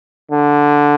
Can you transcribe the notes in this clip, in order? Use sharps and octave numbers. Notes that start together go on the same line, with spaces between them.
D3